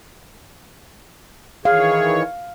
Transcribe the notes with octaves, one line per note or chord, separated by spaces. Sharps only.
D#3 E3 G#4 C#5 F5